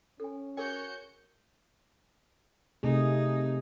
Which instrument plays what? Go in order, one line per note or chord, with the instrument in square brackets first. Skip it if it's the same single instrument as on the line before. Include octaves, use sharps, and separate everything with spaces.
[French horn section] C#4 [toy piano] A4 G#5
[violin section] F#4 G6 C#7 [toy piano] G#4 A#4 G#5 [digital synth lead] C#5
[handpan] C3 A3 G#4 [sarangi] D#4